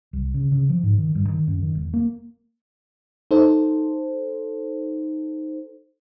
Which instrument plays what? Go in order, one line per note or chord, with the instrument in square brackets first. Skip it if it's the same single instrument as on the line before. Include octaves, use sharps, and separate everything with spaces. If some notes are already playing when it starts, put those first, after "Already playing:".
[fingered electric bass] C2
C#3
C#3
F3
G#2
D#3
G2
D#3
F#2
D#3
E1
A#3
[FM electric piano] D#4 A4 C5